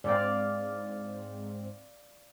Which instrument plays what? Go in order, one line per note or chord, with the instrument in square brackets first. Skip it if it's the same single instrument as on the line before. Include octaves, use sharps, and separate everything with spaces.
[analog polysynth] G#2 C4 [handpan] D5 F5